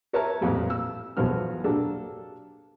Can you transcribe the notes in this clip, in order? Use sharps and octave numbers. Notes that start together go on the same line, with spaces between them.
A#4 B4 C#5 E5 A5 A#5
A1 F2 A#2 B4
E6
B1 E2 F3 B3 F#4 F6
F#3 A#3 D4 G4 A4